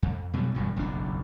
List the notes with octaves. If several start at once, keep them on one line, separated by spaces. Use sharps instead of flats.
F2
B2 F#3 G3
E1 G2 F#3
F#1 B1 F2 D4